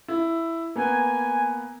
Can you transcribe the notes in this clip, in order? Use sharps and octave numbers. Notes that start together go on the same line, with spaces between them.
E4
A#3 B3 G#5